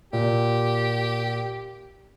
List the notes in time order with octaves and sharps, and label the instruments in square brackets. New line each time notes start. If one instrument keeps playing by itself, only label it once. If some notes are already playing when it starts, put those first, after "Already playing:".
[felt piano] A#2 [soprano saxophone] G4